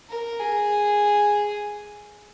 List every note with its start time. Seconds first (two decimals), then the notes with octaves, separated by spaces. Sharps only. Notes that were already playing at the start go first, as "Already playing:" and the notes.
0.09 A#4
0.40 G#4